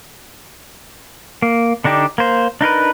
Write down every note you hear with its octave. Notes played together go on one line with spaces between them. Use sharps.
A#3
D3 D4 D#4 G4
A#3 C5
D4 D#4 A#4 B4